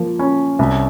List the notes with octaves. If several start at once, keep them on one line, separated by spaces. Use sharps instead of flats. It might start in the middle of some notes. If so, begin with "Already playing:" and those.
Already playing: F3 A#3
C#4
C2